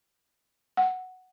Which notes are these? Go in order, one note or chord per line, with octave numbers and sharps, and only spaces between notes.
F#5